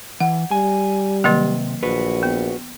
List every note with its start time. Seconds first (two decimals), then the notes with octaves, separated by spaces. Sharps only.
0.20 E3 F#5
0.51 G3 G#5
1.24 C3 D#3 F#3 A#3
1.83 A#1 F#4 B4
2.23 B3